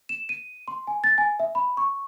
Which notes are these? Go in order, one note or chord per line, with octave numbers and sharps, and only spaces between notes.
E7
D#7
C6
G#5
A6
G#5
E5
B5
C#6